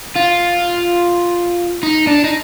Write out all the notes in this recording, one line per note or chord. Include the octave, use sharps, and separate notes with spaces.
F4
D#4
D4
D#4